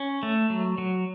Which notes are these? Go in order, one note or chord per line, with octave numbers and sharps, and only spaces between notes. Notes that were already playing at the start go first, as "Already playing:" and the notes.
Already playing: C#4
A3
F#3
F#3